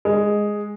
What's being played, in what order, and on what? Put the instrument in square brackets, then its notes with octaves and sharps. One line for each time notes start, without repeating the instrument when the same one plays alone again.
[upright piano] G#3